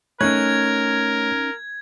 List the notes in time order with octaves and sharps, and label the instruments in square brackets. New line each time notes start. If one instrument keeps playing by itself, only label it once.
[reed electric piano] A3 C#5 F#6 [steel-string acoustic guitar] C#4 D#4 G#5 [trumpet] A#4 [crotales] G#6